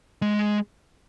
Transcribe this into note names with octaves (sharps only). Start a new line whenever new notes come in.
G#3